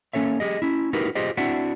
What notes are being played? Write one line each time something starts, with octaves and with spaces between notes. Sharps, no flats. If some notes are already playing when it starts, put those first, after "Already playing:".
A#3 C#4 A4 C#5 E5
G4 G#4 D#5
C#4 E4
D#4 E4 F#4 G4 A#4 B4
F4 G4 G#4 C5 D#5
C4 D4 E4 F#4 E5 F#5